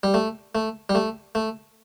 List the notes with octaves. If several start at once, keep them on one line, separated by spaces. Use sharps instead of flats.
G3
A3
A3
G3
A3
A3